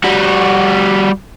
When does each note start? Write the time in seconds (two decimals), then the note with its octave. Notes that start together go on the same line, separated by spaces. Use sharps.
0.04 G3 F#4